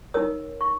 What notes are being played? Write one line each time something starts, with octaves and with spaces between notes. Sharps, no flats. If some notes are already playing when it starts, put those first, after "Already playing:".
D#4 A#4 C#5 D#6
C#6